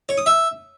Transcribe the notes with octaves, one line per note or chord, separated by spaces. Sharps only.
C#5
D#6
E5